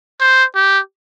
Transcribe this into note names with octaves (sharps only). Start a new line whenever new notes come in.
C5
G4